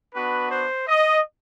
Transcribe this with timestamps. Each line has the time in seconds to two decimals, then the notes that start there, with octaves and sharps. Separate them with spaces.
0.14 B3 D4 F#4 B4
0.51 C5
0.88 D#5